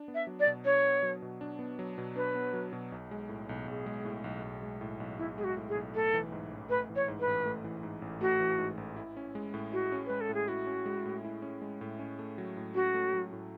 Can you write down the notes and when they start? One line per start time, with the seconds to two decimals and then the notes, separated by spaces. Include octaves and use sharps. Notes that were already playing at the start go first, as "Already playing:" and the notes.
Already playing: D4
0.08 B3
0.14 E5
0.27 F#3
0.40 D5
0.47 B2
0.65 D4 C#5
0.84 B3
1.03 F#3
1.22 B2
1.41 D4
1.59 B3
1.79 F#3
1.98 B2
2.16 D4 B4
2.35 B3
2.53 F#3
2.73 B2
2.92 B1
3.11 G#3
3.29 A2
3.49 B1
3.68 B1 G#4
3.86 G#3
4.05 A2
4.24 B1
4.44 B1
4.63 G#3
4.81 A2
5.00 B1
5.18 B1 E4
5.38 G#3 G#4
5.44 F#4
5.57 A2
5.69 G#4
5.75 B1
5.95 A3 A4
6.14 E3
6.32 G#2
6.51 A1
6.70 A3 B4
6.90 E3
6.96 C#5
7.08 G#2
7.20 B4
7.27 A1
7.45 A3
7.64 E3
7.83 G#2
8.02 A1
8.21 A3 F#4
8.40 E3
8.59 G#2
8.77 A1
8.96 E4
9.16 C#4
9.35 G#3
9.54 A2
9.72 E4 F#4
9.92 C#4
10.06 G#3 B4
10.21 A4
10.29 A2
10.34 G#4
10.48 E4 F#4
10.67 C#4
10.86 G#3
11.05 A2
11.25 E4
11.42 C#4
11.62 G#3
11.81 A2
11.99 C#4
12.19 A3
12.38 F#3
12.57 A2
12.75 C#4 F#4
12.94 A3
13.14 F#3
13.33 A2